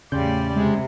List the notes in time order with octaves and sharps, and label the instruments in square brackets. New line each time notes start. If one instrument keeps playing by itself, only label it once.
[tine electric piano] E2 C6 G6 [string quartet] A2 G3 D5 [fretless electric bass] C#3
[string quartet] C3 [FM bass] G#3